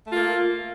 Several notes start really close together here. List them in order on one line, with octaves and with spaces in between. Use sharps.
A3 F4 A#3